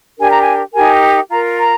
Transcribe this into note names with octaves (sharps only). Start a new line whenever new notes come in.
D4 G4 A#4 G#5
A#5
G#5
D#4 G4 A#4 G#5
F4 A#4 A#5
A#5